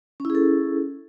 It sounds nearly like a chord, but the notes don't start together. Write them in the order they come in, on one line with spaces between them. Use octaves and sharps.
C#4 E4 G#4 A4